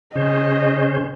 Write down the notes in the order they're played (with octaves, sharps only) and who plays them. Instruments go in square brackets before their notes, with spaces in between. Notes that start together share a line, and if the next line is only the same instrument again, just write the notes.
[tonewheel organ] C#3 C#4 C5 [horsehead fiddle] D#5